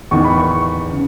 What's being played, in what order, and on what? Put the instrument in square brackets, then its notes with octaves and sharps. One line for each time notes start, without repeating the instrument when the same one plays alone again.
[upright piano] E2 D#3 C#6
B5
C#6
C#3